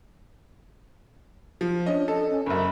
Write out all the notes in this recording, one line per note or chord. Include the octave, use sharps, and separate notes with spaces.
F3
C#4 D4 D#5
A4 D#5
C#4
F#1 F#2 B5